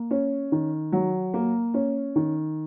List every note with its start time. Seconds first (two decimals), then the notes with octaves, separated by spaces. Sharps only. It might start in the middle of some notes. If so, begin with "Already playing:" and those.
Already playing: A#3
0.11 C#4
0.52 D#3
0.92 F#3
1.34 A#3
1.74 C#4
2.16 D#3